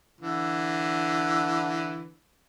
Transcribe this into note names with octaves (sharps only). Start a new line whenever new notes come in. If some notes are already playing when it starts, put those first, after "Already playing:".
D3 E3